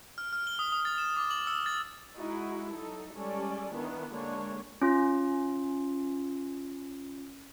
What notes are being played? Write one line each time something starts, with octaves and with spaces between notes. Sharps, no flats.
F6
F6
G7
D#6
D#6
A6
E7
D6
F#7
E6
A6
G#3 D#4 E4 F#4
F#3 D#4 A4
G3 G#3 C#4 A4 D5
D#3 E3 B3 D4 E4
D3 G#3 A#3 D4 C#5
C#4 F4